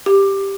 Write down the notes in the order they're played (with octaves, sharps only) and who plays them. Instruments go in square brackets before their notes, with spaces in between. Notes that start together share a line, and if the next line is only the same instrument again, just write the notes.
[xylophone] G4